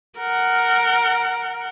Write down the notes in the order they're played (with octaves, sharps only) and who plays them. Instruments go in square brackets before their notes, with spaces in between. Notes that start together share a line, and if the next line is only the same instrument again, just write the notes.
[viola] A#4 F#5